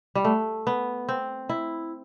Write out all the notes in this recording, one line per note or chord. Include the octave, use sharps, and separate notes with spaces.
G3
A3
B3
C4
E4